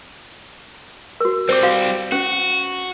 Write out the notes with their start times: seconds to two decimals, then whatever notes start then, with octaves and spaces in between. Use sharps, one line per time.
1.20 F#4 A#4
1.49 G3 C4 C5 D6
1.63 F#4 F5
2.12 C#4 F#4